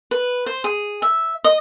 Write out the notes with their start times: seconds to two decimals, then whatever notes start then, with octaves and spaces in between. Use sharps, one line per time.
0.11 B4
0.46 C5
0.64 G#4
1.02 E5
1.44 D#5